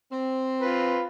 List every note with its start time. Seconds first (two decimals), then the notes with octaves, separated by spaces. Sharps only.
0.12 C4
0.61 F4 B4